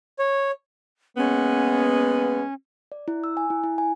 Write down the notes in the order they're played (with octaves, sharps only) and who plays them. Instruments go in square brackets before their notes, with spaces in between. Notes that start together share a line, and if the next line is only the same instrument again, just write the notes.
[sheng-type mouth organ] C#5
[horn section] G#3 A#3 B3 [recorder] C#4
[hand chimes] D5
E4
E6
G#5
E4
E4
G#5